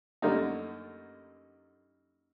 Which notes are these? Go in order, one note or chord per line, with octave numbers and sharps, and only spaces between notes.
F#2 D3 G3 A3 A#3 D#4